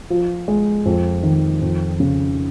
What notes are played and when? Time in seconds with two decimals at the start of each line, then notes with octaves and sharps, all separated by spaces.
0.10 F3
0.48 G#3
0.86 F2
1.23 D#3
1.61 F2
2.00 C#3